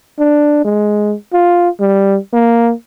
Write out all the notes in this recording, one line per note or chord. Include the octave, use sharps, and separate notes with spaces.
D4
G#3
F4
G3
A#3